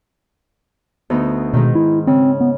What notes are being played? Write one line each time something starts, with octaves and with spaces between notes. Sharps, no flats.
D2 B3 D#4
G#2 B2 D#3
E4
C#3 C4
B3